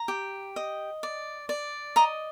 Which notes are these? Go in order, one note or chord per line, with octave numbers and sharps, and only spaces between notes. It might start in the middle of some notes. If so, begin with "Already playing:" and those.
Already playing: A#5
G4
D#5
D5
D5
D#5 A#5